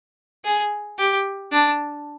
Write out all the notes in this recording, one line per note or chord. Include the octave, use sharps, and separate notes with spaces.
G#4
G4
D4